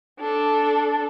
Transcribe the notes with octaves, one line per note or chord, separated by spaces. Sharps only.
D4 A4